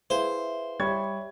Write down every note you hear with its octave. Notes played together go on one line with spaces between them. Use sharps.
E4 G#4 B4 C5 E5 F5
G3 C#5 E5 C#6 G#6